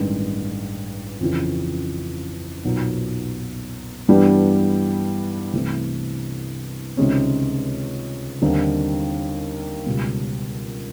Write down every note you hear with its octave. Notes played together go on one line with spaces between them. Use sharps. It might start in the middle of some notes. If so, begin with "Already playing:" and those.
Already playing: A1 G2 D#3 G#3
F2 C#3 E3
B1 A#2 F#3 B3 D#4
G2 E3 G3 B3 D4
C2 C3 E3 A3 C4
C#2 C3 D#3 G#3 C#4
D#2 D3 G3 C4 D#4
C#2 B2 G3